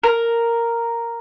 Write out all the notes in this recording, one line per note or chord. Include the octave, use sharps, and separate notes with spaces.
A#4